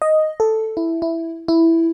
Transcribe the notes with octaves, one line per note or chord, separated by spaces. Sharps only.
D#5
A4
E4
E4
E4